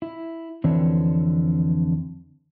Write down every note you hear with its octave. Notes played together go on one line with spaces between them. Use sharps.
E4
F2 D3 E3 C4 D4 C#5